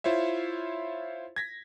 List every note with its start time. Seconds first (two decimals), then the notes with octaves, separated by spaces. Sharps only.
0.04 E4 F4 C5 C#5 E5
1.36 G#6 A#6 B6